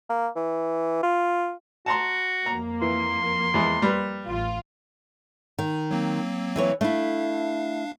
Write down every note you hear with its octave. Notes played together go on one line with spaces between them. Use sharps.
A#3
E3
F4
F#4 A5 A#5 C6
F2 A#3 A#5
E3 C6
E2 G#3
G3 B4
A1 F4
D#3
F#3 A#3 C4
E3 B4 C#5
A3 D4 E4 F5